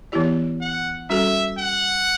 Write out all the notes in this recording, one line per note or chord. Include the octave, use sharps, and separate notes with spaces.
E3 B3 E4 G4 D5
F#5
G3 C#4 F#4 A4 E5
F#5